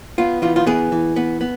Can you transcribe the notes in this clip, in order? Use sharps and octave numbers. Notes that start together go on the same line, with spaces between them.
B3 F4
E3 F4
F4
B3 G#4
E3
B3
B3